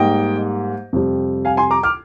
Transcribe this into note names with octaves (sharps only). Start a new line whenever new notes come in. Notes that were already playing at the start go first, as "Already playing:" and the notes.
Already playing: G#2 G3 A#3 D#5 G5
F2 C3 G3
F5 G#5
G#5 C6
A#5 D6
D6 F6